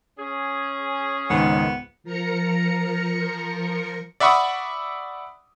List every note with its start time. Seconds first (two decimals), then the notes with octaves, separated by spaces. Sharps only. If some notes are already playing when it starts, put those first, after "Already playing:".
0.18 C#4 G#4
1.30 C#2 G#2 D#3 B3
2.04 F3 A#4 A#5 C#7
4.20 D5 E5 F#5 B5 C#6 D#6